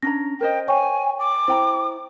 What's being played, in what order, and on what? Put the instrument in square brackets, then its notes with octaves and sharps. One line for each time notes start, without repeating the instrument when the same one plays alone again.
[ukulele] C#4 D4 A#5 [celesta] A#6
[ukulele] A#4 C5 D#5 [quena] G5
[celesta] C#5 G5 C#6 [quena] G#5
[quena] D6
[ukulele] E4 G5 A#5 [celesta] C5